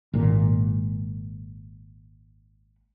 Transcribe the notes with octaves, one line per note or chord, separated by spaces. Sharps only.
G#1 A#2